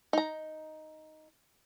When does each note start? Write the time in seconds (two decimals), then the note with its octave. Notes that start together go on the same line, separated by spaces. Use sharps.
0.13 D#4 A#5